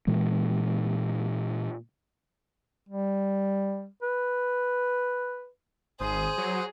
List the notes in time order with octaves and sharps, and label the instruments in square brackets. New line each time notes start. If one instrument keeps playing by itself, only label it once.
[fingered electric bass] A#2 E3 G#3
[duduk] G3
B4
[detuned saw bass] G#1 [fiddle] G#4 [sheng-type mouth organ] C5 D#6
[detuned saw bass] F#3